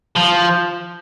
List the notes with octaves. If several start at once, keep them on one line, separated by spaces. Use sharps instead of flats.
F3